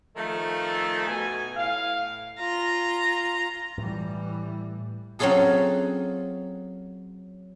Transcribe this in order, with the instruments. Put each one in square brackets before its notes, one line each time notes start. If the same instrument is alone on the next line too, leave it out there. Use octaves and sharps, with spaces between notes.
[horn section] D#3 F3 A3
B2 G#5
A2 F5
[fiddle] F4 A#5
[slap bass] A2 A3 [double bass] E3 G3
[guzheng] F#3 C4 C#4 F4 G#4 A4